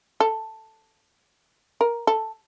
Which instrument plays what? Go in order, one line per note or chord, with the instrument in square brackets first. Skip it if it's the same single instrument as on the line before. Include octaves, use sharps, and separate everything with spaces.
[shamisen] A4
A#4
A4